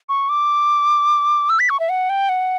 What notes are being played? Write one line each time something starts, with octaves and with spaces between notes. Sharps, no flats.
C#6
D6
E6
B6
C#6
E5
F#5
G5
F#5